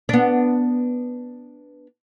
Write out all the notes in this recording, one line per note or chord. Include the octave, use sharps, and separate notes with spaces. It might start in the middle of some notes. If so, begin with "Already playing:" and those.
B3 D4